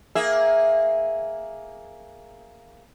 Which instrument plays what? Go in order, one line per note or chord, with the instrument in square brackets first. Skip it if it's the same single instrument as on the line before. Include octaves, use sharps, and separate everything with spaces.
[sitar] A#3 G#4 E5